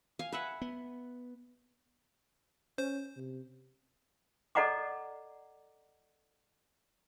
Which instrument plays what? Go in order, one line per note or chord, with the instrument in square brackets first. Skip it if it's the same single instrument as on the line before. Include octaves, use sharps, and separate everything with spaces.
[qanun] F5 G#5
B4 E5 F#5
[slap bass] B3
[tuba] C#4 [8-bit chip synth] C5
[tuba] C3
[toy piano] A4 D5 D#5 F#5 A#5 D6